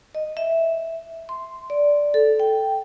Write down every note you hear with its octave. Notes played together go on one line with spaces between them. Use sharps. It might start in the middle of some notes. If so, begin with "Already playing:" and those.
D#5
E5
C6
D5
A4
G5